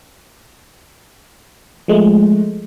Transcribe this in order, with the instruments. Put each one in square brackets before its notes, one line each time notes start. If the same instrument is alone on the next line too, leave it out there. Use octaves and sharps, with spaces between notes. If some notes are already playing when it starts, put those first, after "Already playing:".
[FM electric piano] F3 G#3 A3